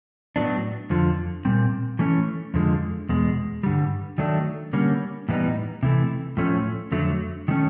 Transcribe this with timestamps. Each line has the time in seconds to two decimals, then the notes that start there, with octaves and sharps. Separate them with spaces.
0.36 A2 F#3 B3 D4
0.90 F2 D3 F3
1.45 A#2 G3 C4
1.99 E3 A3 C#4
2.54 F2 D3 F3 G#3
3.09 E2 B2 G#3
3.63 G2 D3 G3
4.18 D#3 F#3 A3 D4
4.73 D3 G3 A#3 C#4
5.29 A2 E3 G3 B3 D#4
5.83 C3 E3 A3
6.37 A2 F3 A3 C#4
6.92 F2 D3 F#3 A3
7.48 D#3 F#3 A3 C#4